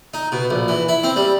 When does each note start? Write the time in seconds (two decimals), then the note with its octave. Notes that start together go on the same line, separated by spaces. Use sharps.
0.14 D#4
0.32 B2
0.50 A#1
0.68 E3
0.89 E4
1.04 C4
1.16 G3